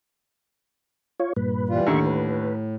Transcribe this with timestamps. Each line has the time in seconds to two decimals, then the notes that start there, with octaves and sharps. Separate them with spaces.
1.20 F4 C#5
1.36 G2 A#2 B4
1.69 E3 G3 F4
1.87 D#2 A2 D3 E5 C#6
2.06 B4